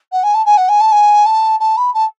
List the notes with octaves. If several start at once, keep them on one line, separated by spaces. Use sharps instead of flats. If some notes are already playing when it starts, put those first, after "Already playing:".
F#5
G#5
A5
G#5
F#5
G#5
A5
G#5
A5
A5
B5
A5